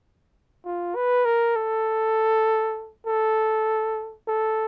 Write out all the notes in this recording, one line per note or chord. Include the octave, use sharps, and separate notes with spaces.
F4
B4
A#4
A4
A4
A4